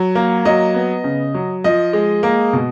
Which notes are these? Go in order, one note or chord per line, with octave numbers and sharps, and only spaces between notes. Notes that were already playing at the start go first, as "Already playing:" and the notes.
Already playing: F#3
A#3
F#3 D#5
B3
C#3
F#3
F3 D#5
G#3
A#3
B2